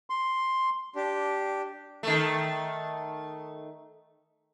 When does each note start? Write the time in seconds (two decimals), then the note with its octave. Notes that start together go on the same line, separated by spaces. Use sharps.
0.10 C6
0.96 D4 G4
2.03 D#3 A3